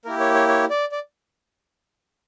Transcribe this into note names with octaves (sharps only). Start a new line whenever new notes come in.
A#3 E4 G4 A#4
C#5
C#5
C#5
D5
D5